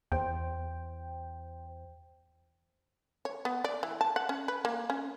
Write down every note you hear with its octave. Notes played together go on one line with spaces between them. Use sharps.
E2 C5 G5
C#5
B3
D5
E3
A5
F#5
C#4
B4
A#3
C#4